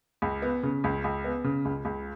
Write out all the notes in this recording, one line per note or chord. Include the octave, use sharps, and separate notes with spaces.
C#2
B3
C#3
C#2
C#2
B3
C#3
C#2
C#2